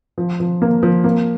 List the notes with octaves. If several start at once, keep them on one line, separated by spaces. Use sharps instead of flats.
F3
F3
A#3
F3
A#3